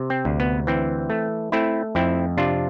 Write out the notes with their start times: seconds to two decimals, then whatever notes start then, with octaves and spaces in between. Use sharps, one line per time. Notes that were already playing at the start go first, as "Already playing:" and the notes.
Already playing: C3
0.10 C4
0.25 D2
0.40 B3
0.67 E3 C4
1.10 A3
1.52 A3 C4 E4
1.95 F2 C4 E4
2.37 C3 D4 F4